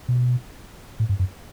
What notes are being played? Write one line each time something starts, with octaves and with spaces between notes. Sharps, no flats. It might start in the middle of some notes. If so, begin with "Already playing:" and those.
B2
A2
G2
F#2